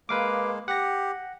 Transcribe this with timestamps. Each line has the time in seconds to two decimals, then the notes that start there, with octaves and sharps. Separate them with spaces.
0.09 G#3 A#3 B4 F5 D6
0.68 G4 F#5 A#6